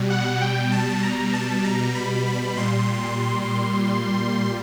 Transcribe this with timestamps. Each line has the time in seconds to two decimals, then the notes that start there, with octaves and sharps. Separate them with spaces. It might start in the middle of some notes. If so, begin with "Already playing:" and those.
Already playing: B2 G3
0.10 F#5
0.41 G5
0.71 A5
1.02 A#5
1.33 A5
1.64 A#5
1.95 B5
2.26 B5
2.56 A#2 G3 C6